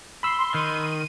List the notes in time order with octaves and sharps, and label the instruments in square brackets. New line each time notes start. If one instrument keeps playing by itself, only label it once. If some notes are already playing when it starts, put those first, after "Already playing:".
[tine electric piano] B5 E6 [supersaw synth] C6
[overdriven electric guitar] D#3 [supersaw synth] D#7